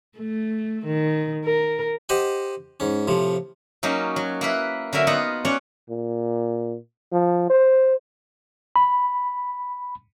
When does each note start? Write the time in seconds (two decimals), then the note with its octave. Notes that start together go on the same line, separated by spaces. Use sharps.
0.18 A3
0.86 D#3
1.45 A#4
2.09 G4 C5 D#5 F#5
2.80 G#2 C#4
3.07 A2 C3 F3
3.83 F#3 A#3 C#4 D#4
4.16 F#3
4.41 A#3 E4 B4
4.93 D3 F#3 A#4 E5 G#5
5.07 B3 D#4 F4 D#5 F#5
5.45 C#4 D4 C#5 D5 F#5
5.90 A#2
7.13 F3
7.50 C5
8.76 B5